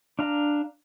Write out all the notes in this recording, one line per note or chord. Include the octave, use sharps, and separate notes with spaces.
D4 F5 A#5